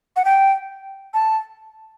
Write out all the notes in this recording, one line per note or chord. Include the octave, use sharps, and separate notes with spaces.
F#5
G5
A5